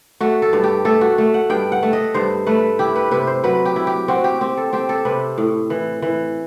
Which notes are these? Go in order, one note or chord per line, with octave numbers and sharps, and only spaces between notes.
A3 F#4
A4
G2
G4
A3 A4
F#4
A3
F#5
G2 G5
F#5
A3
D#5
G2 C5
A3 B4
E4 G4
B4
C3 B4
C5
F#3 B4
G4
E4
G4
C4 F#4
G4
C4 G4
A4
C4 G4
A4
C3 B4
A2
E3
E3